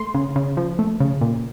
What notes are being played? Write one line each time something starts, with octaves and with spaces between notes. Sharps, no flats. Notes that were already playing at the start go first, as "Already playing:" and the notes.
Already playing: A3 C6
C#3
C#3
F3
A3
C#3
A#2